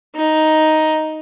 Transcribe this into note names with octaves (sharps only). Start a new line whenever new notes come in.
D#4